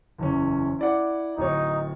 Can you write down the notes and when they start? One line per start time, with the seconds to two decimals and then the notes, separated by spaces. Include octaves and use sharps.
0.18 F#1 E2 C#4
0.79 E4 D5 F#5
1.37 D1 D#4 C#5